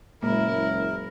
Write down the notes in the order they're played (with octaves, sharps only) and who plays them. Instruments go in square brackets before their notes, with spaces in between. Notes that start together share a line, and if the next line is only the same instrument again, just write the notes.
[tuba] F#1 [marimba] A#2 G#3 A#3 [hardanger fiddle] E4 [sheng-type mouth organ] A#4